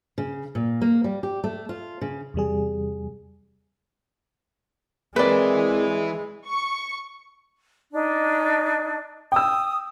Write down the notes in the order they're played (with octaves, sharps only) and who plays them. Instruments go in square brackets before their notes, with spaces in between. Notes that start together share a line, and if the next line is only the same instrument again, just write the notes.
[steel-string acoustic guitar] C#3
A#2
A#3
G3
G4
A3
F4
C#3
[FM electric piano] E2 C3 G3 G#4
[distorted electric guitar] E3 E4 [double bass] G#3 [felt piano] C4 A#4 B5 [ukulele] B4 D5
[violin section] C#6
[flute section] D4 D#4
[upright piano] G5 E6 [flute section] D#6